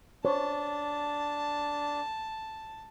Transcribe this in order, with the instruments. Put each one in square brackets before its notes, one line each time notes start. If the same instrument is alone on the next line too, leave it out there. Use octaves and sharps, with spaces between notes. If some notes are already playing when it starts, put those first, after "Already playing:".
[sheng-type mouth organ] D4 [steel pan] C5 C#5 [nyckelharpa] A5